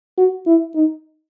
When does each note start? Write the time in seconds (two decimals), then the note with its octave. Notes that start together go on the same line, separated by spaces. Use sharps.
0.18 F#4
0.47 E4
0.75 D#4